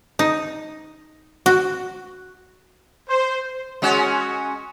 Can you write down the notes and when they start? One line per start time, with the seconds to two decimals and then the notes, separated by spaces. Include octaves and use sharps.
0.19 D#4
1.46 F#4
3.09 C5
3.82 G#3 C#4 F#4